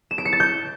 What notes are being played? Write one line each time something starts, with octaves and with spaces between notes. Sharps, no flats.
E7
D7
C#7
A6
G6